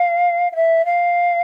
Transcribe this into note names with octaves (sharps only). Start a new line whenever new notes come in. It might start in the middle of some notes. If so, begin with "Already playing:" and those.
Already playing: F5
F5
E5
F5